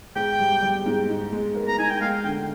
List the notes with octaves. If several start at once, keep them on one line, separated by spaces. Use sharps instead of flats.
G#2 G5
G3
G3
G#2
D#4
G#3
A#4
A#5
D#4 G#5
G5
G#3 F5
D3 G5